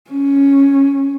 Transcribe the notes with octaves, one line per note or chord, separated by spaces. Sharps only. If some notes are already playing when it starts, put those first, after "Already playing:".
C#4